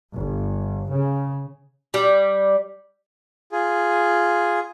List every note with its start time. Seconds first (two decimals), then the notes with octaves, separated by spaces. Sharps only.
0.15 G1
0.92 C#3
1.94 G3
3.52 F4 G#4